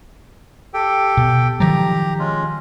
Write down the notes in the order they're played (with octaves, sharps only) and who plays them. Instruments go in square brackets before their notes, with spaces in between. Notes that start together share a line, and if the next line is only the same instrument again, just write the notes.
[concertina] G4 A4 G5
[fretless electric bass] B2
[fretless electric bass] D#3 F3 F#3 [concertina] G4 A#5
[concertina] G#3 C#4 F4